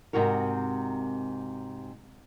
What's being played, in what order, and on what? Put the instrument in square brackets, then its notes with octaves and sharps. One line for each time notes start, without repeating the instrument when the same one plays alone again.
[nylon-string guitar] G#2 C3 C4 F#4 A#4